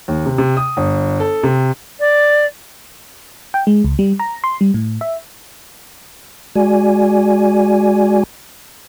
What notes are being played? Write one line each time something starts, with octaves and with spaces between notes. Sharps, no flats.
D#2
C3
C3
D#6
G1
A4
C3
D5
G5
G#3
C#2
G3
A#5
C6
G3
A2
E5
G#3 F#4 D5 G#5